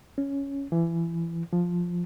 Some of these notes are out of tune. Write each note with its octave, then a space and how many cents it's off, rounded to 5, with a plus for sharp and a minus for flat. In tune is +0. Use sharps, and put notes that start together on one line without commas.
C#4 +5
E3 +25
F3 +5